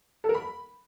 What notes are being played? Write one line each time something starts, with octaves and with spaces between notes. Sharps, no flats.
A4
A#4
B5